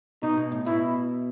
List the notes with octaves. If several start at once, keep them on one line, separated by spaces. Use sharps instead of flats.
B2 D#4
B2
A2
B2 E4